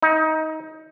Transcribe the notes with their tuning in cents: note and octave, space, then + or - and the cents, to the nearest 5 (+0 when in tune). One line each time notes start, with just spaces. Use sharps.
D#4 +20